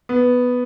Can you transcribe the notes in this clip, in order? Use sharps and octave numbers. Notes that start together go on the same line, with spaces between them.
B3